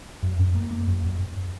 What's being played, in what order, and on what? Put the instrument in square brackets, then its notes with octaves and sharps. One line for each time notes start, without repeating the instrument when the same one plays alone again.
[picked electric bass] F#2
F#2
A#3
A#3
F#2
F#2
F#2